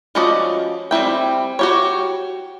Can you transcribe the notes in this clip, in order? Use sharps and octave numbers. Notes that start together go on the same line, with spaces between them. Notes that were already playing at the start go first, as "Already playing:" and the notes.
F3 C#4 F#4 D5 D#5
G3 C4 E4 G5
F#4 G4 C#5